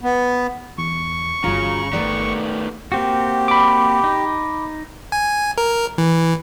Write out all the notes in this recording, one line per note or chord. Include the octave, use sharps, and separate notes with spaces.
B3
E2 C#6
G1 C#3 F4 F#4 A#5
D#3 A3 B3 G4 A4 D5
A#3 C4 F#4 G4
B5 D6
D#4
G#5
A#4
E3